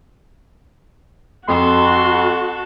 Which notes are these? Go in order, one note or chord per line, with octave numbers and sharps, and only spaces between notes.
F2 F#4 A4 C6